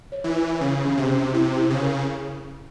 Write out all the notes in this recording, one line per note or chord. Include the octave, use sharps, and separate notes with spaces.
C#5
E3
E4
C#3 C#4
C#4
C3
C#4
C3 E4
E4
C#3
A#4